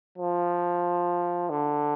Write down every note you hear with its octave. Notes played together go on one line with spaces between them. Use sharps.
F3
D3